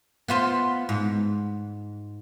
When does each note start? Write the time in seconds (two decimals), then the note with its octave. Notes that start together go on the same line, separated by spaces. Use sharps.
0.28 B3 F4 C5
0.89 G#2